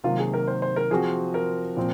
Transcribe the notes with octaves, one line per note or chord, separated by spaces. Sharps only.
C3 D#3 F#3 A#3 F4
G#4
A#4
C5
C5
A#4
F3 C4 F#4 G#4
A#4
A#2 F3 C4